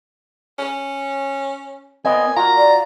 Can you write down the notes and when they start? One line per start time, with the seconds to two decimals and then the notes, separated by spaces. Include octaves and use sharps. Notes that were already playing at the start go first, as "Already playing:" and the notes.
0.59 C#4
2.05 A#2 B3 C4 D#5 G#5
2.37 F4 F#4 A#5
2.58 D5